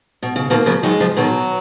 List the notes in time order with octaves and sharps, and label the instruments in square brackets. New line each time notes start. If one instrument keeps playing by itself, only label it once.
[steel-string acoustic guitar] B2
C#3
[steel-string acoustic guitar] B2 D#3 [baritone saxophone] A#3
[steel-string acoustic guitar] C#3 F3
[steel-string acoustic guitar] D#3 F#3 [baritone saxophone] G#3
[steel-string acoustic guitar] C#3 F3
[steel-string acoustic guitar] B2 D#3 [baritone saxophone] F#3